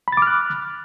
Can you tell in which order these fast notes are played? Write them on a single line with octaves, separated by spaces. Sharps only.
B5 A6 D6 F6 F#6